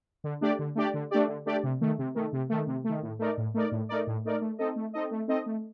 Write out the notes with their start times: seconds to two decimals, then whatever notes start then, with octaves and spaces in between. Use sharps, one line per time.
0.24 D3
0.41 A3 D4 G4 D5
0.59 D3
0.75 A3 D4 G4 D5
0.94 D3
1.11 A3 D4 G4 D5
1.28 D3
1.46 A3 D4 G4 D5
1.64 C3
1.81 D#3 A3
1.98 C3
2.15 D#3 A3
2.33 C3
2.49 D#3 A3
2.67 C3
2.84 A3
2.89 D#3
3.02 A2
3.19 A3 D#4 A#4 D5
3.38 A2
3.54 A3 D#4 A#4 D5
3.72 A2
3.89 A3 D#4 A#4 D5
4.07 A2
4.25 A3 D#4 A#4 D5
4.41 A3
4.58 C4 D#4 A4 D#5
4.76 A3
4.93 C4 D#4 A4 D#5
5.11 A3
5.28 C4 D#4 A4 D#5
5.46 A3